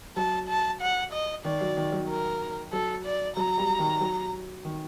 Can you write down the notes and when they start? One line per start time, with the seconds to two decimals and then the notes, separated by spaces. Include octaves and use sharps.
0.16 F#3 A5
0.48 A5
0.81 F#5
1.12 D#5
1.45 D#3 D5
1.61 F#3
1.77 D#3
1.92 F#3
2.09 A#4
2.73 F#3 A4
3.05 D5
3.36 F#3 A#5
3.58 G3
3.79 D#3
4.01 F#3
4.65 D#3